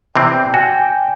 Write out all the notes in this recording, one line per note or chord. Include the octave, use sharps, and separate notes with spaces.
C3 E3 C4 D5 G5
F#4 G#5